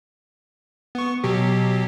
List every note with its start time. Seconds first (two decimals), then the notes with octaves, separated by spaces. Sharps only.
0.95 B3 C#6
1.24 B2 F#3 G4